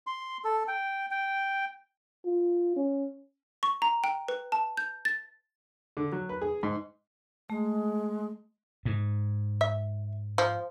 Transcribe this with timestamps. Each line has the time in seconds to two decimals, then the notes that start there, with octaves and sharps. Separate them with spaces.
0.07 C6
0.44 A4
0.68 G5
1.11 G5
2.25 F4
2.76 C#4
3.63 C#6
3.82 A#5
4.04 G5
4.28 B4
4.52 A5
4.77 G6
5.05 A6
5.97 D3
6.12 F#3
6.29 B4
6.42 G#4
6.63 G#2
7.50 G#3 A3
8.85 G#2
9.61 E5
10.38 F3